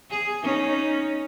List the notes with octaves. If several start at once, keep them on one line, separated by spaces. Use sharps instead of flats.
G#4
C#4 D#4